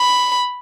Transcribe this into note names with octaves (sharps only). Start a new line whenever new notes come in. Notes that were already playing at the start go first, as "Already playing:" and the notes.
Already playing: B5